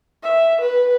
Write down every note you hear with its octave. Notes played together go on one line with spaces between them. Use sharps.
E5
B4